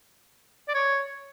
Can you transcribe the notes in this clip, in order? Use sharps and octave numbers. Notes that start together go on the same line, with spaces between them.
D5
C#5